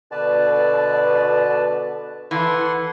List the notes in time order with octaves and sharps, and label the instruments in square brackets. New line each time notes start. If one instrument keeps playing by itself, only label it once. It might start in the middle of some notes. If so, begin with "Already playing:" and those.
[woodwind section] B2 D3 [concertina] B4 D5 A5
[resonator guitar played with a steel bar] E3 [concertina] A4 F#5 C6